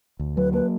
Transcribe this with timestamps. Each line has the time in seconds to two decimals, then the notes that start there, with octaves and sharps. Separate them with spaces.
0.19 D2
0.37 F#3 B4
0.53 A#3 B4